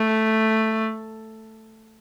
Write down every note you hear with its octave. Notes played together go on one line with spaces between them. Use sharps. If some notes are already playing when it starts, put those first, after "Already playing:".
Already playing: A3